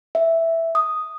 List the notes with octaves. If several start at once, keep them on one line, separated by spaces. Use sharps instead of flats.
E5
D#6